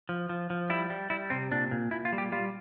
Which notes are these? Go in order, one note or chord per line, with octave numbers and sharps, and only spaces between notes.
F3
F3
F3
G3 E4
G3
G3 E4
C3 C4
A#2 D4
A#2
A#2 E4
F4
G3
G4
G3 F4